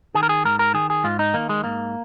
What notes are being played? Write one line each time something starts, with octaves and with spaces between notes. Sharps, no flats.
D#3 G#4
A#4
G#4
G#2 A#4
A#4
D#3 G#4
G#4
G#2 F4
D#4
D#3 A#3
G#3
G#2 A#3